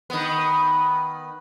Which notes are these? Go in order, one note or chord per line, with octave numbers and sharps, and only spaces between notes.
D#3 B3